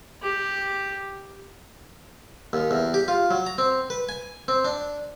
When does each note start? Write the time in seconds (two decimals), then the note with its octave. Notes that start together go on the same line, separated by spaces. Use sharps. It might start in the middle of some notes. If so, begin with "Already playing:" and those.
0.23 G4
2.53 D#2
2.71 E2
2.94 G4
3.08 F4
3.31 F#3
3.46 A#5
3.58 C4
3.90 B4
4.09 G#5
4.48 C4
4.65 D4